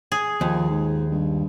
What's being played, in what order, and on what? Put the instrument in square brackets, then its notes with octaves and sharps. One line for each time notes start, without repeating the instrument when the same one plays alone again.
[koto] G#4
[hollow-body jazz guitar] D#2 [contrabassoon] F3
[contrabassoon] G#2
G2